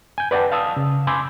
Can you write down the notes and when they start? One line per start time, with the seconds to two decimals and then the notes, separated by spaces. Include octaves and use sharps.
0.18 G#5 G6
0.31 B4 D5 F#5 G5 A5
0.52 F5 A5 D#6 E6
0.76 C#3
1.07 G#5 B5 C6 D6 E6 G6